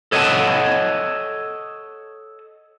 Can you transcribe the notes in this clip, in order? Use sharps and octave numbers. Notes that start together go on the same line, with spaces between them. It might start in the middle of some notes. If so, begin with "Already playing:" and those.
A4 C#5 D#5 E5 F#5 A5